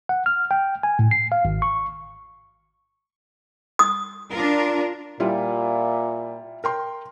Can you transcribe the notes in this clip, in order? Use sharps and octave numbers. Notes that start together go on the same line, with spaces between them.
F#5
F6
G5
G#5
A2
C7
F5
G#1
C#6
D#6
D4 F4 A#4
A#2 G3 E4 F4
A#4 G5 C6